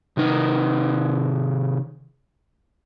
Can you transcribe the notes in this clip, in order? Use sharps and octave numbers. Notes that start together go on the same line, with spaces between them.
C3 D#3 D#4